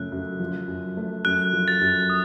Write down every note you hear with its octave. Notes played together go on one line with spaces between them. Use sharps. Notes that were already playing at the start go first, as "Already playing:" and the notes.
Already playing: F#2 C#3 F3 A3 F#6
F#2
F3
F#2
A3
F#2 F#6
F3
A6
F#2
D#6